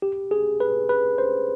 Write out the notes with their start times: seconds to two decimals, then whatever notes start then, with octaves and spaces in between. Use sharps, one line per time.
0.02 G4
0.31 G#4
0.60 B4
0.89 B4
1.18 C5